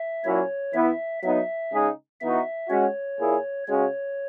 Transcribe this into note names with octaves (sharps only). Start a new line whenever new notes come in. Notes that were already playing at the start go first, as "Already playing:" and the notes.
Already playing: E5
A#2 F#3 A#3 C#4 E4 C#5
E3 B3 E4 E5
F#3 B3 D#4 E5
C#3 G#3 D#4 G#4
E3 B3 D#4 F#4 E5
G#3 C#4 F#4 C#5
A#2 A#3 E4 G#4
C#3 G#3 C#4 F#4 C#5